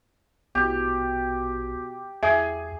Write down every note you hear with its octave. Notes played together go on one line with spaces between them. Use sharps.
A#1 B2 G4
E2 G#4 E5